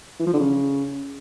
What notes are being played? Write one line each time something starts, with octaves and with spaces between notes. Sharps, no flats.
E3
F3
D3
C#3